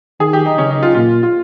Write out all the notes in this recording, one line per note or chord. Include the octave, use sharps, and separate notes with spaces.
D#3 G#4
G4
D#4
C#3 C#4
D#4
F4
A#2 F4
F4